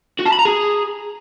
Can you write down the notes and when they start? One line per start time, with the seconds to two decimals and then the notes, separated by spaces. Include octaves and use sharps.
0.20 F#4
0.26 A5
0.33 B5
0.39 A#5
0.46 G#4